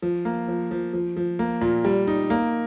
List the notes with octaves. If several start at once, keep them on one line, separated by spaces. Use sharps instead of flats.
F3
A#3
F3
F3
F3
F3
A#3
A#2
G3
D#4
A#3